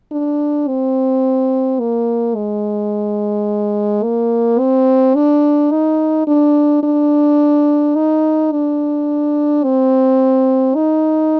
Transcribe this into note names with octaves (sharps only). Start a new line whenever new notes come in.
D4
C4
A#3
G#3
A#3
C4
D4
D#4
D4
D4
D#4
D4
C4
D#4